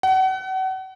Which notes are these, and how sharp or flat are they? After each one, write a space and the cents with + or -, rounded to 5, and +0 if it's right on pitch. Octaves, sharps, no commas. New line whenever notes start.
F#5 +35